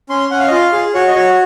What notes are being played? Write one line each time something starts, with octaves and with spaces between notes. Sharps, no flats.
C#4 C6
C#4 F#5
F5
D#5
F4 F5
G#4
F#4 C#5
D#5
F#4 C#5